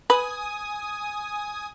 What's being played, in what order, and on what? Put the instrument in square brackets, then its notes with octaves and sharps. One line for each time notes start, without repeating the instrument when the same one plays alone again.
[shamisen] B4 [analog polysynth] G#5 D#6